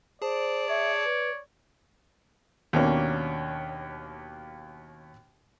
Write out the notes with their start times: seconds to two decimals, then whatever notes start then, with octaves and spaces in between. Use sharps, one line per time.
0.22 G#4 C5 D5 A5
0.69 C#5 E5
1.04 B4
2.73 D#2 B2 A#3 C#4 D4